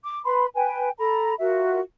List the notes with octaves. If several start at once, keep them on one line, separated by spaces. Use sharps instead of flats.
D6
B4 B5 C6
B4 G5 G#5
A4 A#5 B5
F4 F#4 A#4 E5